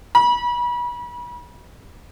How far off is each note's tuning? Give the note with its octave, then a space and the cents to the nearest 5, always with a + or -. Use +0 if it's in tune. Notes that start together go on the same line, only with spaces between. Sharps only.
B5 -35